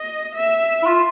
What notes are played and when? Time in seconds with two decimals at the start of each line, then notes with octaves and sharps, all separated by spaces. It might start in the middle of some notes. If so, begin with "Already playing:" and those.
Already playing: D#5
0.35 E5
0.83 E4
0.86 F4